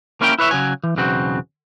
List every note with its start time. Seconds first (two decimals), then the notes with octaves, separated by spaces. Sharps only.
0.21 A#3 C#4 E4 A#4 E5 G5
0.39 E4 B4 C#5 E5
0.51 C#3 F#3 G#5
0.84 E3
0.96 B1 E2 C#3 C4 F#4